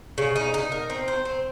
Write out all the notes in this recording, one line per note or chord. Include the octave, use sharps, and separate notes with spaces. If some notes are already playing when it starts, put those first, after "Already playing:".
C#3
D#4
D#4
A#4
C4
C5
C4